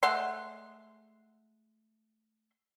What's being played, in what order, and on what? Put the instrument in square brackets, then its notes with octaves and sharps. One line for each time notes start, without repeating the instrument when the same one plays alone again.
[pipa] G#3 A3 F#5 C6